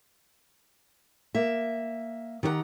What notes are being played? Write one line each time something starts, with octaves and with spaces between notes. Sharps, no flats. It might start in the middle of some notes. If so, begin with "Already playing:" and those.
A#3 E5
D#3 G4 C5 F#5 A#5